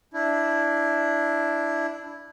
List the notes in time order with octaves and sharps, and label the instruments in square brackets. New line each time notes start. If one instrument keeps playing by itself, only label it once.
[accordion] D4 E4